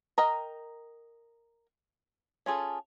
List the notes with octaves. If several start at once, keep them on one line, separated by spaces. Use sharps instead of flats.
A#4 D#5 G5 A#5
C#4 F4 G#4 A4